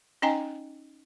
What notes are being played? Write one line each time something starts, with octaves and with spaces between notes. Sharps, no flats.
C#4 D#4 D#5 G5 G#5 A#5